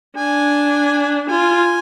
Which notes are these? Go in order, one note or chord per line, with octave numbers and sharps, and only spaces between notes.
D4 G#5
F4 G#5